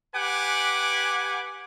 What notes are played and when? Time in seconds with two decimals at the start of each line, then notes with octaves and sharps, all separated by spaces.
0.15 G4 B4 F#5 G#5 D6